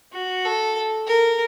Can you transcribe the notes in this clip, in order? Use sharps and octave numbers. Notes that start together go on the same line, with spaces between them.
F#4
A4
A#4